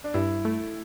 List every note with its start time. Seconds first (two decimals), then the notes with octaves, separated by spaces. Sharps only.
0.04 D4
0.14 G2 E4
0.45 A3